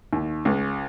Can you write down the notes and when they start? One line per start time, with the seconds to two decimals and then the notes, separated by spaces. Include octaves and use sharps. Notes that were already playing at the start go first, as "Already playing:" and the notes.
0.13 D#2
0.45 C#2